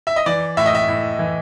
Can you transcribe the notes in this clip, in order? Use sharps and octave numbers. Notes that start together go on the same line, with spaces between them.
E5
D#5
E3 D5
A2 E5
D#5
E5
A2
E3